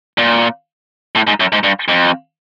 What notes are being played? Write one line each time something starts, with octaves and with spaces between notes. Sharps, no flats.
A#2
A2
G#2
F#2
G#2
G2
F2